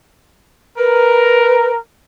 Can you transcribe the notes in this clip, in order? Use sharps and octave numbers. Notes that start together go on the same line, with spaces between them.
A#4 B4